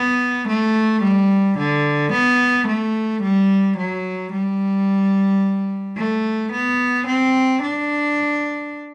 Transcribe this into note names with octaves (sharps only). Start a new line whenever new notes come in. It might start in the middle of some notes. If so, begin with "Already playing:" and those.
Already playing: B3
A3
G3
D3
B3
A3
G3
F#3
G3
A3
B3
C4
D4